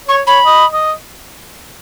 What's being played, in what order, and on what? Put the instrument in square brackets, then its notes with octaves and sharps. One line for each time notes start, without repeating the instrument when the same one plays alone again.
[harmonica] C#5 [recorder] C#6
[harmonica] C#5 [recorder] B5
[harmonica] D#5
D#5